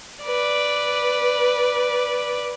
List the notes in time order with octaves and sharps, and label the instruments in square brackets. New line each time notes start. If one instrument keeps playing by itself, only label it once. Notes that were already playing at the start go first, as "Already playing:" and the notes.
[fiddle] B4 D5